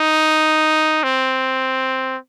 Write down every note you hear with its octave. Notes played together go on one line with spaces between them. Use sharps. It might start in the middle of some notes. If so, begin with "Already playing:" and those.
Already playing: D#4
C4